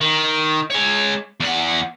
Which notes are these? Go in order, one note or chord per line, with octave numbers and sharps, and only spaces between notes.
D#3
G#3 C#5
E2 F#5